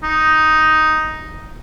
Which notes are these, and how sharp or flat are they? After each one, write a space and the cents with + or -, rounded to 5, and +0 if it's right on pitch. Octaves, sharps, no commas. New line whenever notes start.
D#4 +5